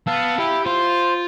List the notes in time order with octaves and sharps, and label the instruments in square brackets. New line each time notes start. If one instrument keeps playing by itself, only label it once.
[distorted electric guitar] B3 [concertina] F5 A5 E6
[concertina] E4 [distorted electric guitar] G4
[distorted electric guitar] F4 [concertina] C5